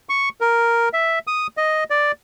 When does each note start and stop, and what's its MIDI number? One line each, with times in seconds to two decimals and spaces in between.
0.09 0.29 85
0.41 0.89 70
0.93 1.19 76
1.27 1.47 87
1.57 1.84 75
1.90 2.12 74